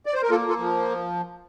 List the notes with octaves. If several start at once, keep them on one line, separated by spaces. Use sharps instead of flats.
D5
C5
A#4
A#3 F4 A4
F4 A4
F3